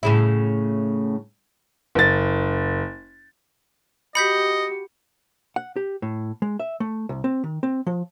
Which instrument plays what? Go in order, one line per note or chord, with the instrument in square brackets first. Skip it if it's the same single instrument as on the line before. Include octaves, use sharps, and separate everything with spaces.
[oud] A2 C#3 E4
[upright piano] F#1 A6
[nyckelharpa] F#4 G4 [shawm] D#5 [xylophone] B5 G6 B6 [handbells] C#7
[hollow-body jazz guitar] F#5
G4
A2
G#3
E5
A3
C2
C4
D#3
C4
F3